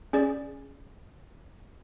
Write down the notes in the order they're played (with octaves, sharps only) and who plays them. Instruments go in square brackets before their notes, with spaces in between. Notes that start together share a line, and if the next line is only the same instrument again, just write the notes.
[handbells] C#4 G#4 D5